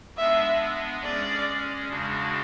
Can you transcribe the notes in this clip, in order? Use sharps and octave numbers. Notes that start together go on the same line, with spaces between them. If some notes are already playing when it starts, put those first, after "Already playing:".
G#3 B3 D4 E5
G#3 C#4 G#4 D5
E2 C#3 G#3 D4 F#4